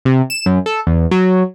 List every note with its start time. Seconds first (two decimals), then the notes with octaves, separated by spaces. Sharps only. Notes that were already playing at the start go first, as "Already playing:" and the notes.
0.05 C3
0.30 E7
0.46 F#2
0.66 A4
0.87 E2
1.11 F#3